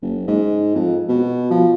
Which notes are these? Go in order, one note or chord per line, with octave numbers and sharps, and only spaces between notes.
F#1
G#2
F2
B2
F3